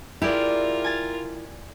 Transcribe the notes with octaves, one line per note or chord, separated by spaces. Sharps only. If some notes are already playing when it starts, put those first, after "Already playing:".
E4 F4 G4 G#4 A#4 D5
G#5 A6